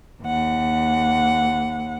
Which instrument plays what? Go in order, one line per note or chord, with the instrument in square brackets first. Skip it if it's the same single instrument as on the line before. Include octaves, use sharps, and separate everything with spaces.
[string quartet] D#2 F#5